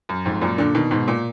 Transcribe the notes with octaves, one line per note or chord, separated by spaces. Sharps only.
F#2
F2 G#2
F#2 A#2
A#2 D3
B2 D#3
G#2 B2
A#2